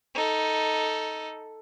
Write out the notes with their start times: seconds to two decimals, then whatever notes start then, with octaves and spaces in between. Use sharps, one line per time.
0.15 D#4 A4